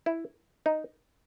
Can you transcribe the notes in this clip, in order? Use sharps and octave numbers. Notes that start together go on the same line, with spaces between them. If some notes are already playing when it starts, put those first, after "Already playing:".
E4
D#4